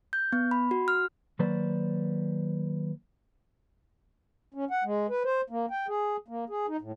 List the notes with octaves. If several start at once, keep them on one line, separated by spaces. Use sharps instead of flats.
G6
B3
B5
F#4
F6
D#3 F#3 A#3 B4 C5 D5
C#4
F#5
G#3
B4
C5
A#3
G5
G#4
A#3
G#4
D#4
A2